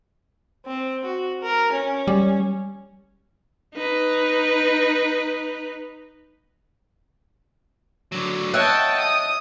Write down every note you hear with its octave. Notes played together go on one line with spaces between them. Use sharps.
C4
F#4
A#4
C#4
G3
D#4 B4
D3 F#3
C#5 D#5 E5 F#5 G5 A5
D#6